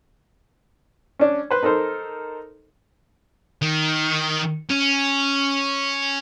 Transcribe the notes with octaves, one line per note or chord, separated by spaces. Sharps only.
C#4 D4
B4 C5
D#4 A4 A#4 C5
D#3
C#4